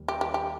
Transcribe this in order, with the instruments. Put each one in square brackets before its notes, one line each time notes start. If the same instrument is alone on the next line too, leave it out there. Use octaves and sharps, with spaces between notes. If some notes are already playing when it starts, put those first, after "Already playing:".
Already playing: [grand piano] D#2 G3
[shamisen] G4
G4
G4